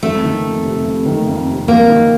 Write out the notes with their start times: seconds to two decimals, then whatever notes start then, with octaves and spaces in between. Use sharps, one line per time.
0.03 F2 A3
0.23 D#3
0.44 F2
0.65 C3
0.85 F2
1.06 D#3
1.28 F2
1.48 C3
1.68 F2 A#3
1.89 D#3